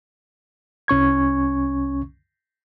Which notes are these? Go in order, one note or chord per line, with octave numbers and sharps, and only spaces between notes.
C2 C#4 C#6 G#6